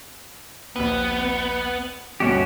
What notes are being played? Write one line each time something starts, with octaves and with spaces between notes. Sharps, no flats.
A#1 D#2 B3
D2 G2 B2 C#4 F#4 G4